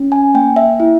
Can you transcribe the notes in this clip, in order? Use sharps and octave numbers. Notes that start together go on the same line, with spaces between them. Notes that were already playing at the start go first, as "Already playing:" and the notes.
Already playing: C#4
G#5
A#3 G5
E5
E4